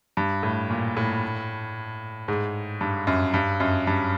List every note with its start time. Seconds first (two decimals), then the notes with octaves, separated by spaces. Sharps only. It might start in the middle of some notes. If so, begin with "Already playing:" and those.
0.17 G2
0.43 A2
0.70 A#2
0.97 A2
2.28 G#2
2.81 G2
3.07 F#2
3.34 G2
3.60 F#2
3.87 G2